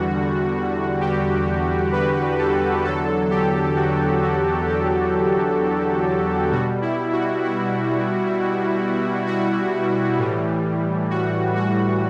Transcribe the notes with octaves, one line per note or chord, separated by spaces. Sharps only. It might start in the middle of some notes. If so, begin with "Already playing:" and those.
Already playing: E2 D3 G3 F#4
G4
B4
A4
E2 D3 F#3 A4
G4
F#4
F#4
G4
B2 G3 F#4
E4
F#4
E4
F#4
A2 E3 G3
F#4
F#4